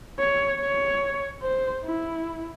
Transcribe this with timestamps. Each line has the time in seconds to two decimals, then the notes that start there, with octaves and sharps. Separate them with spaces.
0.19 C#5
0.60 C#5
1.42 C5
1.84 E4